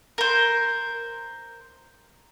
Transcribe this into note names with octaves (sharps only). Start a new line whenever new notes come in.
A#4 C5